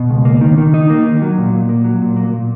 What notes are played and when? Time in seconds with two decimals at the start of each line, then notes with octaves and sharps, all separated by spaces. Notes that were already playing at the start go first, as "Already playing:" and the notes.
Already playing: B2
0.10 C#2
0.25 A#3
0.41 D#3
0.58 D#3
0.74 D#4
0.90 A#3
1.05 D#3
1.22 F#3
1.38 A#2
1.53 A#2
1.69 A#3
1.85 F#3
2.02 A#2
2.17 A#3
2.33 A#2